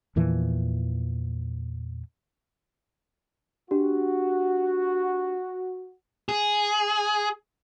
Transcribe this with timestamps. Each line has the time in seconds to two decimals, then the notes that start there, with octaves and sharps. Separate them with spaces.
0.16 E2 A#2 E3 F3
3.71 D4 F#4 G4
6.29 G#4